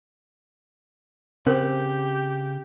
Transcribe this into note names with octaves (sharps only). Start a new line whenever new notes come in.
C#3 C4 G4 A#4